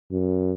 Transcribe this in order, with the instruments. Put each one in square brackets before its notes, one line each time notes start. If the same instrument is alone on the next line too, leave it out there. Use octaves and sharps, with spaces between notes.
[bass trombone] F#2